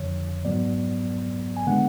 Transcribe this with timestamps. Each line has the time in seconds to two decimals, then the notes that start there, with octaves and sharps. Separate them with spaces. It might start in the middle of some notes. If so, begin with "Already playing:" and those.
Already playing: F2 D3 F3 C#5
0.45 G#2 F#3 B3 D5
1.57 G#5
1.67 D3 G#3 B3 F#5